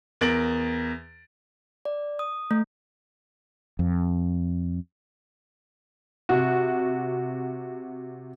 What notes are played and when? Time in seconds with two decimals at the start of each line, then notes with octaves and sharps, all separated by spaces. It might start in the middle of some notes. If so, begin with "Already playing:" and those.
0.21 E2 A#4 A6 D7 F#7
1.85 D5
2.19 D#6
2.51 A3
3.79 F2
6.29 C3 F#4